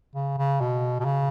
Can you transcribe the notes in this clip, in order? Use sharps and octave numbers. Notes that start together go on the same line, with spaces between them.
C#3
C#3
B2
B2
C#3